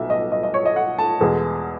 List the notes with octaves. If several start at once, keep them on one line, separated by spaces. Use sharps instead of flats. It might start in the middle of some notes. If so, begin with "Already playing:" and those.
Already playing: B1 B2 E5
D#5
D#5
D#5
C#5
D#5
F#5
A5
E2 B2 G#3